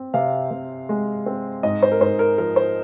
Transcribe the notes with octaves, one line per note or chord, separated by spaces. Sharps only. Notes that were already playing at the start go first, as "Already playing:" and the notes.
Already playing: C4
C3 F5
C3
G#3
C4
G#2 D#5
C5
A#4
G#2 C5
A#4
F3 A#4
C5